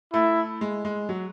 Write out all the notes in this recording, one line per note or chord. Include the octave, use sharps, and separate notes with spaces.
A3 E4
G#3
G#3
F#3